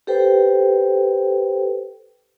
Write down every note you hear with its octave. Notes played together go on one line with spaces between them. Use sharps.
G4 A4 B4 C5 G5